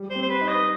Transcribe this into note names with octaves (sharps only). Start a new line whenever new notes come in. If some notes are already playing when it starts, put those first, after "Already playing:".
Already playing: G3
C5
C4
C5
B4
D#4
D#5